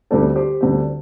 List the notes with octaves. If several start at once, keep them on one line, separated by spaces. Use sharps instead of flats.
D2 D3 G3 C4 A4 D5
G4 C5
D2 D3 G3 C4